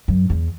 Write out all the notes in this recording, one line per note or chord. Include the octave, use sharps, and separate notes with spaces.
F#2
E2